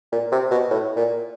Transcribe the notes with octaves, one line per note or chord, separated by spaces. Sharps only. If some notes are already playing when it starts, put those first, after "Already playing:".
A#2
C3
B2
A2
A#2